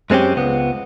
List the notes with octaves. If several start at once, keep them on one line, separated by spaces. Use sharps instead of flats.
F#2 G#3 C4 C#4 G4
C#2 B3